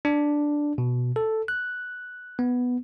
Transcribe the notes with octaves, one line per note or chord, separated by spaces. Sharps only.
D4
B2
A4
F#6
B3